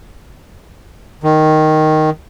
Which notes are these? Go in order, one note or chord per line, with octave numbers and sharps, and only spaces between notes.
D#3